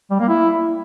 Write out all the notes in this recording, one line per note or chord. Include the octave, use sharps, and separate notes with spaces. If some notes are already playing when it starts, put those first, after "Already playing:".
G3
A#3
E4